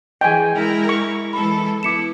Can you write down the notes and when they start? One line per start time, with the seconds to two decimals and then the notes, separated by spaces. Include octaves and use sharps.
0.21 E3 G#4 D#5 G5 G#5
0.55 G#3 E4 A#4
0.89 C#6
1.33 E3 G#3 A4 B5
1.83 B3 E4 D6 C#7 E7